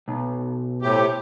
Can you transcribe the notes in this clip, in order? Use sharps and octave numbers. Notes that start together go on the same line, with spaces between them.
B1
A2 C3 G4